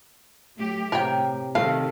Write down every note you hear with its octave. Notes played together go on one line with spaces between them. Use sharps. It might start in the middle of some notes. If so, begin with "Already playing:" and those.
F#3 A3 G4
A2 C3 G4 A#4 C#5 G5
C3 D#3 A3 F5